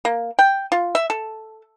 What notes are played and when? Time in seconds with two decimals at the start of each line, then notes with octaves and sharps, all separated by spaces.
0.05 A#3
0.39 G5
0.72 F4
0.95 E5
1.10 A4